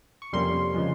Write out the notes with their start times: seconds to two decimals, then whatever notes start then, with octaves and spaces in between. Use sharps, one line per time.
0.22 C#6
0.33 F2 C3 G3 A#3 C#4 C6
0.74 C#3 F3 G#3